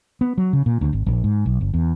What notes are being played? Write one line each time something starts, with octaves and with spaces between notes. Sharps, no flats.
B3
F#3
C#3
A#2
D2
G#1
A#1
G#2
B1
G1
E2